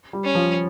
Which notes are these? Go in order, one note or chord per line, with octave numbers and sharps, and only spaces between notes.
G3
C#4
F3